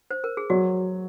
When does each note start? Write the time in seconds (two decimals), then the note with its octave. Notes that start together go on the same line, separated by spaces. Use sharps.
0.11 C5
0.24 A#4
0.37 G#4
0.50 F#3 F#4